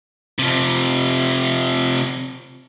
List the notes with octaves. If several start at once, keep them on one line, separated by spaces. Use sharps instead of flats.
C3 F3